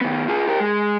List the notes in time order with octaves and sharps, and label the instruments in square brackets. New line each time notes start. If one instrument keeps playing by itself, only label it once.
[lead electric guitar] D#3 B3
F4 G#4
G4 A#4
G#3